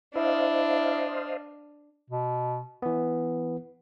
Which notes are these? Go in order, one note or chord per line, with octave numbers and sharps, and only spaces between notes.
D4 E4 C5 D#5 F5
B2
E3 B3